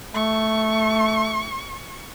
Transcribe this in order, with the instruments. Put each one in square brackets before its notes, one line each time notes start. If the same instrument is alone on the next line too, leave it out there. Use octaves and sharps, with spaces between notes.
[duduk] A3 [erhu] C#6